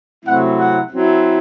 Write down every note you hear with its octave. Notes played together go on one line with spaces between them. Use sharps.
C3 F#3 A3 C4 E4 F#5
F#5
F#3 C4 E4